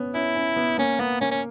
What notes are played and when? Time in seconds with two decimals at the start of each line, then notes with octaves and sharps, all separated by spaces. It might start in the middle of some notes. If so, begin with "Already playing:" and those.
Already playing: B3 C#4
0.14 C#4 E4
0.35 C#4
0.56 B3
0.78 A#3 C#4
0.99 A#3 B3
1.21 A#3 C#4
1.31 C#4